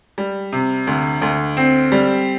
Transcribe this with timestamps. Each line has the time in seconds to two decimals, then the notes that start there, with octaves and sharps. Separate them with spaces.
0.18 G3
0.53 C3
0.87 D2
1.22 D2
1.57 C4
1.92 G3